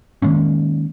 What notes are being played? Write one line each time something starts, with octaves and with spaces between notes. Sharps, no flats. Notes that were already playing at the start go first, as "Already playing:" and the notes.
D#3 G#3 A#3 C#4